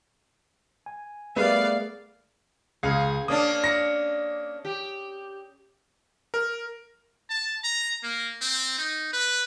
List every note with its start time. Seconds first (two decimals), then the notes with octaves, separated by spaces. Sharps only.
0.86 G#5
1.36 G3 A3 B3 G#4 A#4 B4 D5 F5
2.83 C#2 G#4 F5
3.28 A#3 C#4 D4 D#6
3.64 A#6 C#7
4.65 G4
6.34 A#4
7.30 A5
7.64 A#5
8.03 A#3
8.41 C4
8.78 D#4
9.13 B4